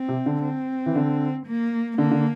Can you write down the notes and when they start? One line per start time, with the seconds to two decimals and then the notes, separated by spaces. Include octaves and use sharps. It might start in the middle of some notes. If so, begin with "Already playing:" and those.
Already playing: C4
0.08 C3
0.26 D3
0.43 C4
0.86 E3
0.95 D3
1.46 A#3
1.98 D3 A#3
2.11 D3